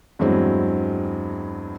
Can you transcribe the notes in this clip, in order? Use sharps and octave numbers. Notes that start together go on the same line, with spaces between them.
E2 G2 E3 F#3 G#3 C4